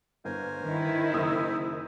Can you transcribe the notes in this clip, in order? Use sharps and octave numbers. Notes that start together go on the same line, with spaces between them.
G1 A#4 C5 G#5
D#3 E4
F#1 D#6 E6